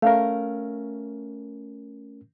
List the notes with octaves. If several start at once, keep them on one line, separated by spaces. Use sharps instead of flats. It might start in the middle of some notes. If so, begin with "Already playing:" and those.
A3 C#4 A#4 F5